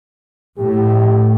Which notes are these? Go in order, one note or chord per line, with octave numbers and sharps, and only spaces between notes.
A2 G4